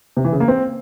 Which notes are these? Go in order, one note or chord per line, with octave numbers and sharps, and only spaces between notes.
C3
E3
C#3
A#3
C4